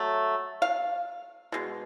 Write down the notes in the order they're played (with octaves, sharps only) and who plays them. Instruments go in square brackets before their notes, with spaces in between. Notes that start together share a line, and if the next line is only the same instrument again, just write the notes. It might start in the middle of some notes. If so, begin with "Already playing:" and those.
Already playing: [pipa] F#3 A3
F5
B2 G#3